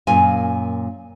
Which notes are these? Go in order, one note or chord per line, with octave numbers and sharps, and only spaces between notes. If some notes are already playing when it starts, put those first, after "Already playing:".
F#2 A#2 F4 G#5